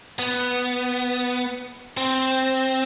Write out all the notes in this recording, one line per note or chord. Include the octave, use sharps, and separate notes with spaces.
B3
C4